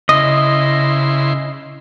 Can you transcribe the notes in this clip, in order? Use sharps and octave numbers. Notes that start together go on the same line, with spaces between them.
C#3 E4 D#5 C6